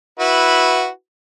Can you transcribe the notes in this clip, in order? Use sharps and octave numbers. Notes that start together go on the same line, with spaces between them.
E4 F#4 B4